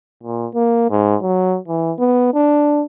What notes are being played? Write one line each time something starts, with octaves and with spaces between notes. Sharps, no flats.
A#2
A#3
G#2
F#3
E3
B3
D4